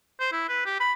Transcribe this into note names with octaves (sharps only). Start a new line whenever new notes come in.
C5
E4
B4
G4
B5